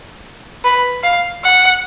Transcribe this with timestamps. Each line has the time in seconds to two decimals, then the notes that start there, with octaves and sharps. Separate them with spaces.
0.64 B4
1.03 F5
1.44 F#5